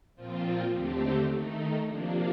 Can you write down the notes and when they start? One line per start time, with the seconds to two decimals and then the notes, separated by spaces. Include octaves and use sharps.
0.15 A#2 F3 C4 F4
0.72 D#2 D3 A3 C4 G4
1.29 D#3 A3 D#4
1.84 C3 F3 A#3 D4